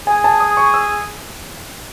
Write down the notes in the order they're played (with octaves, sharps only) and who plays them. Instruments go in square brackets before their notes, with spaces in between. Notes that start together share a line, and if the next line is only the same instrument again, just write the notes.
[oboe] G#4 [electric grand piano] G#5
[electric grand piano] A5
D#6
C#6
E6